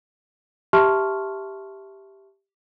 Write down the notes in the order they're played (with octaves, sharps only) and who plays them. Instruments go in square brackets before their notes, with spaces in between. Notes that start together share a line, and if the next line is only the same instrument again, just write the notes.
[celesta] G4 E5 A5 C6 C#6 F6